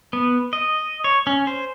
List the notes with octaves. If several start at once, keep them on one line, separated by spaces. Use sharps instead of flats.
B3
D#5
C#5
C#4
C5